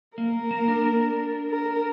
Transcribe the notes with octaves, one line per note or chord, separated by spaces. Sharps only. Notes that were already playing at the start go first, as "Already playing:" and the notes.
A#3 A#4
A#3
D4
D4
A#4